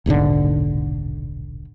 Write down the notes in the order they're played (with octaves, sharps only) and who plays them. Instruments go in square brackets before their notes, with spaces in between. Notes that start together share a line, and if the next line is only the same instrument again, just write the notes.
[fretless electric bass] D#1 B1 G#2 D3